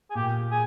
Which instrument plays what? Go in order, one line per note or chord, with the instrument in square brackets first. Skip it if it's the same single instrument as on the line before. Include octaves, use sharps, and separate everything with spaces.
[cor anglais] G#4
[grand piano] A#2 [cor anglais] G4
[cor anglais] G#4